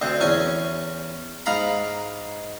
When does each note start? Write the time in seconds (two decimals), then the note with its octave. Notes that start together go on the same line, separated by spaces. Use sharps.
0.02 D2 D3 C4
0.21 E2 C#4 G#5
1.46 G#2 F5 A#5 B5